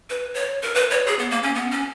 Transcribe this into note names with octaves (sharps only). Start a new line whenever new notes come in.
B4
C#5
A#4
B4
C#5
G#4
B3
A#3
C#4
B3
C#4